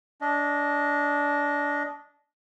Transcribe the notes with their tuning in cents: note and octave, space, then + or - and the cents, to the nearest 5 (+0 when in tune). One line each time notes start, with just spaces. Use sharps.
D4 -20 D#5 +0